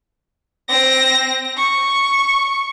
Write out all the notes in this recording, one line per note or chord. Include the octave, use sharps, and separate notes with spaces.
C4 A#6
C#6